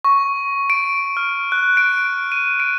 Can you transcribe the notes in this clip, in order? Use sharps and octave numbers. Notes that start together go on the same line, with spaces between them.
C#6
D7
F6
F#6
D7
D#7
D7